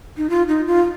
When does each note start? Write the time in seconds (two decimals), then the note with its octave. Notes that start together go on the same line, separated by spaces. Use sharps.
0.17 D#4
0.30 F4
0.48 D#4
0.67 F4